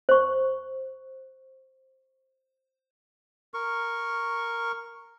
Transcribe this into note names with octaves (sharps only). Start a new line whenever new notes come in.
C5 C#6
A#4 C#6